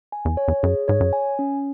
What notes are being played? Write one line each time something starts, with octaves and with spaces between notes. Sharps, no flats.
G#5
E2
C#5
E2
F#2 G#4
G#2 C#5
F#2
G#5
C#4